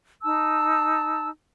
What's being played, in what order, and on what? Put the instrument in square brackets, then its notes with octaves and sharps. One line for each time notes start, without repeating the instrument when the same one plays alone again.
[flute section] D#4 A5 E6